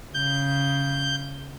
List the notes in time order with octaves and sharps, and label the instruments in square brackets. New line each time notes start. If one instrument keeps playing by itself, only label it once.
[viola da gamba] C#3 [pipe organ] G6